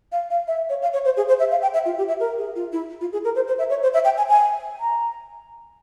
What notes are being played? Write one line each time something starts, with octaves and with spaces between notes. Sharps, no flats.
F5
F5
E5
C#5
F5
C#5
C5
G#4
C5
E5
F5
G5
E5
F4
G4
E5
A#4
G#4
F4
E4
F4
G#4
A#4
C5
C5
E5
C#5
C5
E5
G5
G#5
G#5
A#5